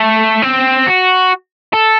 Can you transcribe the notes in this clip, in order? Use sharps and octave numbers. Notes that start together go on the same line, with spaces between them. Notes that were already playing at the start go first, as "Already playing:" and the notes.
Already playing: A3
C4
F#4
A4